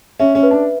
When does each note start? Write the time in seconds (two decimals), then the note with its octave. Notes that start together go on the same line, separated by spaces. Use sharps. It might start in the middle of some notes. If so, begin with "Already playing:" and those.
0.19 C#4 E5
0.35 C#4
0.43 B4
0.51 D4